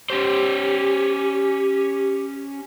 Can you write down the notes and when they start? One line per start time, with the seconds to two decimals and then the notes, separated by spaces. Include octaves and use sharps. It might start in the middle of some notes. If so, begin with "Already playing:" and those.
0.10 C#4 G4 C5